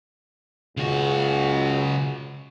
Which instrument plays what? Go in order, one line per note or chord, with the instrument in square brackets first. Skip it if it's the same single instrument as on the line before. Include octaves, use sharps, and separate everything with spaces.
[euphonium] C#2 [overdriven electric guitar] C#3 F#4